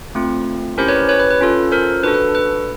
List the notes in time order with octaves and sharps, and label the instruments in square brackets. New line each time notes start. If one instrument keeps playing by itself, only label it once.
[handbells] A3 C4 F4
C#4 E4 G4 A#4 C5
B4 C#5
B4 C#5
B4
B4
C#4 F4 A4
A#4 C5
D4 F#4 A4 B4
B4
B4